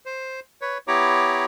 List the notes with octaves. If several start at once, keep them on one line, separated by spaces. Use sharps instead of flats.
C5
B4 C#5
B3 E4 G4 C#5 A#5 D6